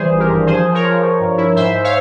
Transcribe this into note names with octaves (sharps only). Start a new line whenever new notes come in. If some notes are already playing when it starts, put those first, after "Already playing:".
Already playing: E3 G3 G#4 C5
G#1
G4 A#4
G2
F3 G#4 C5
F3
A#4 C#5
F3
F3
G2
E4
G#2 C5 E5
G#2
C#5 F5